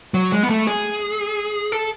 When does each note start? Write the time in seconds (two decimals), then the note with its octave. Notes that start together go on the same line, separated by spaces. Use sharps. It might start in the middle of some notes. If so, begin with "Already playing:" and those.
0.14 F#3
0.32 G#3
0.43 B3
0.50 A3
0.67 G#4
1.72 A4